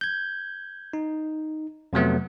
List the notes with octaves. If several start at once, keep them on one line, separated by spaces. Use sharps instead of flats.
G6 G#6
D#4
F2 C3 F#3 A3 B3